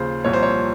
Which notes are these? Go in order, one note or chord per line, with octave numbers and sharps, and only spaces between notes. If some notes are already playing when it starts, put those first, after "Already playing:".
Already playing: D#2 C#3 F3 C5
C2 A#2 F3 C#5
C5
C#5